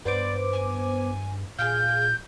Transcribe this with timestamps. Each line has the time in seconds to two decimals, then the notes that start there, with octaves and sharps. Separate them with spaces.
0.05 G2 B3 C5 D5 D6
0.53 G#5
1.59 A#2 G#4 F5 G6